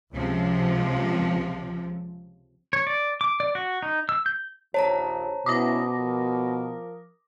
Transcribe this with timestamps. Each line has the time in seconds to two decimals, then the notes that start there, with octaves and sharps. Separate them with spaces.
0.13 C#2 C3 F3
2.73 C#5
2.87 D5
3.21 D6
3.40 D5
3.55 F#4
3.82 D#4
4.09 E6
4.26 G6
4.74 A#1 D#2 C5 C#5 A5 A#5
5.46 B2 B3 C#4 E4 D6 D#6 A#6
5.95 F3 A#4